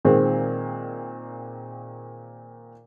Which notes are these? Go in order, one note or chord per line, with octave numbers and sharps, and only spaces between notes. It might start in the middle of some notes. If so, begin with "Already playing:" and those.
A#2 D#3 G#3 C4